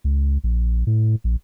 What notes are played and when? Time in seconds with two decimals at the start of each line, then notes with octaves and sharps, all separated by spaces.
0.04 C#2
0.44 A#1
0.87 A2
1.24 A#1